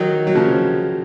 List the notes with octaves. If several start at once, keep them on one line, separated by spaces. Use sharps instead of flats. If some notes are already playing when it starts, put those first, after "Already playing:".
Already playing: D#3 F#3
F#3
C#3 F3